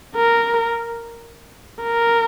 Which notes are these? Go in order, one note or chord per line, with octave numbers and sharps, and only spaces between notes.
A#4
A#4